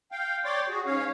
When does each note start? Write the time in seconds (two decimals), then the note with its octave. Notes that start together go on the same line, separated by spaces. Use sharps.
0.12 F5 G5
0.45 C#5 D5 G5 C6 D6
0.69 F#4 G#4
0.86 G#2 C#4 C#5 F5